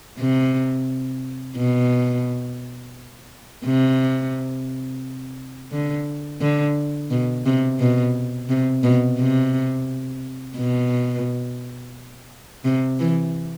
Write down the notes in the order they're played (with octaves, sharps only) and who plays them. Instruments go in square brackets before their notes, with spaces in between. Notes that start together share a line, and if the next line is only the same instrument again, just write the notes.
[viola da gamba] C3
B2
C3
D3
D3
B2
C3
B2
C3
B2
C3
B2
C3
E3